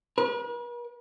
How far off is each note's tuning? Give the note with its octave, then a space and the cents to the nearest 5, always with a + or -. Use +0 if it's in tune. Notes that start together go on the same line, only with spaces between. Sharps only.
B4 -45